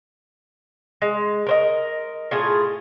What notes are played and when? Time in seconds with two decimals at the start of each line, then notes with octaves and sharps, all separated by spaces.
1.02 G#3
1.47 A#4 C5 D#5
2.31 A2 F4 G#4